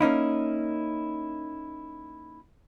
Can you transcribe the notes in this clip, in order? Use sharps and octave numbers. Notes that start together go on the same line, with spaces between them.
A#3 C#4 D#4 E4